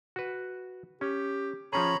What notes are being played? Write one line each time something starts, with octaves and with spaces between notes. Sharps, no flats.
F#4 B4
C#4 G4
F3 C#4 G#4 C#5 A#5 B5